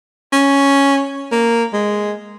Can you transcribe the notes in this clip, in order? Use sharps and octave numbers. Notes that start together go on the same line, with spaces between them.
C#4
A#3
G#3